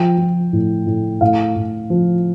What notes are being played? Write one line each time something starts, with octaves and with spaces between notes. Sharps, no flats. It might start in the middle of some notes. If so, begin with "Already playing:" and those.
Already playing: F3 G5
F3
A2
A2
A2 F5
A2
F3